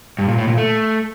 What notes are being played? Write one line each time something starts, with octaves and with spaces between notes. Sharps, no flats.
G2
A#2
A2
A#2
A3